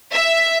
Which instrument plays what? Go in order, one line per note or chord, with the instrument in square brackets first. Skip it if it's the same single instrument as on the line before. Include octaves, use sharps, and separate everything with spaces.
[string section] E5